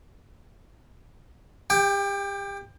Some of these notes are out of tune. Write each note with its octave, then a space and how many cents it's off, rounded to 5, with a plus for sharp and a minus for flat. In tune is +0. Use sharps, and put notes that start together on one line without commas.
G4 +30 G5 +0